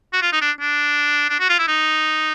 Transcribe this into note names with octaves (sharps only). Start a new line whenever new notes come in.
F#4
F4
D#4
D4
D4
D4
F#4
F4
E4
D#4